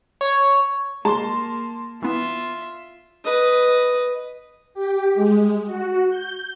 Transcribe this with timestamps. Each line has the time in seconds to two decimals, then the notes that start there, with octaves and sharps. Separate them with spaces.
0.21 C#5
1.05 G#3 A#3 A5 C6
2.02 E3 B3 F4 E5
3.24 B4 D#5
4.74 G4
5.14 G#3
5.66 F#4
6.10 G6